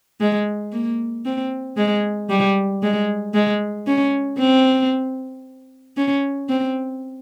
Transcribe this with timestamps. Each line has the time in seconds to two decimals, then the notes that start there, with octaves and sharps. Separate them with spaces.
0.21 G#3
0.73 A#3
1.25 C4
1.77 G#3
2.30 G3
2.83 G#3
3.34 G#3
3.87 C#4
4.39 C4
5.97 C#4
6.49 C4